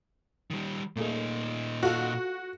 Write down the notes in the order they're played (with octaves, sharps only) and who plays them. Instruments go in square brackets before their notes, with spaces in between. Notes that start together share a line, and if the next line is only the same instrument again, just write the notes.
[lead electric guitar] D#3 G3
[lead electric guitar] A#2 D#4 [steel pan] A3 A#3 G#4
[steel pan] F4 A4 F5 [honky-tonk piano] F#4